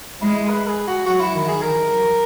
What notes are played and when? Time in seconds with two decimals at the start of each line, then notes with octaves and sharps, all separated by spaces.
0.22 G#3 E4
0.49 B4
0.68 G#4
0.87 F#4
1.06 F#3 F#4
1.20 E4
1.34 D#3
1.48 G#4
1.62 D#3 A#4
1.90 F#3